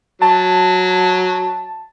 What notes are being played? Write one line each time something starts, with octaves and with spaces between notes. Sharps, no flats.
F#3 A5